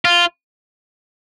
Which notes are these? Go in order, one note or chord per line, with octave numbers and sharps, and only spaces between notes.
F4